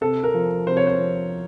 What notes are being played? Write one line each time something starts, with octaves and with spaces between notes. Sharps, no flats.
C3 A4
A#4
F3
C3 C5
C#5
C5
F3